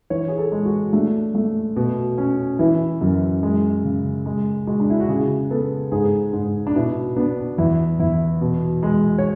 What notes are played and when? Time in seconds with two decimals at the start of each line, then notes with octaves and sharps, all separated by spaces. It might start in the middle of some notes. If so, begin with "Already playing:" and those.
0.10 E3 C#5
0.28 G#4
0.38 A4
0.52 G#3
0.65 F#4
0.93 A3 D4
1.35 A3
1.76 B2
2.18 C#4
2.59 E3 E4
3.01 F#2
3.43 G#3
3.84 C#3
4.26 G#3
4.67 G#3 F#4
4.80 D4
4.90 E4
5.00 F#4
5.09 C#3 G#4
5.51 B3 A4
5.92 G#2 G#4
6.33 G#2
6.67 D4
6.75 B2 E4
7.16 B3 D4
7.58 E2 E4
8.00 E2 E4
8.41 B2
8.83 G#3
9.18 C#5